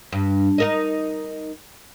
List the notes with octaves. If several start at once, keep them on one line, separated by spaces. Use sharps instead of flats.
G2
D#4 A#4 D#5